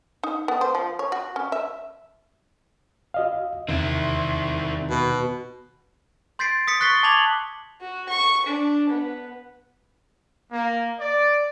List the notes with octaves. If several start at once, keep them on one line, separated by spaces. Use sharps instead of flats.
D#4
B3
C5
F3
C#5
F#4
C#4
E5
F#4 D#5 F5
E2 C3 D#3 C4 E4
B2
C6 G6 A6 B6 C7 D7
D#6 B6 C#7
C#6 F#6 A6 B6 C7 G7
A5 D6 G#6 B6 F7 F#7
F#4
C#6
D4
B3
A#3
D5